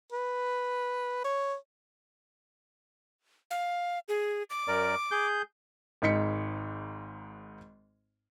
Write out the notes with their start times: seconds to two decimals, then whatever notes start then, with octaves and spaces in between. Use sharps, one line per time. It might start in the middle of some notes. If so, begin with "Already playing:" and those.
0.12 B4
1.25 C#5
3.51 F5
4.08 G#4
4.50 D6
4.68 F#2 A#4 D5
5.11 G#4 G6
6.02 G#1 G#2 D#4 B6 C#7